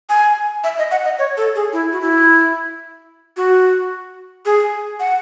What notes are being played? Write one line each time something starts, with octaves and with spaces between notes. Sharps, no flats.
G#5
E5
D#5
F#5
D#5
C#5
A4
G#4
E4
F#4
E4
F#4
G#4
F#5